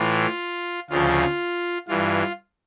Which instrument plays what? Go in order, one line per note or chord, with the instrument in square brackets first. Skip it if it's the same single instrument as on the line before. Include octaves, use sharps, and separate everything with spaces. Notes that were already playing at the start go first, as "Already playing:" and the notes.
Already playing: [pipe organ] A2 E3 F4
D2 C#3 F3 F4
G2 E3 F4